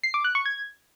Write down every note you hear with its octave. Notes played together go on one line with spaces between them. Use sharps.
C7
D6
F#6
C#6
G#6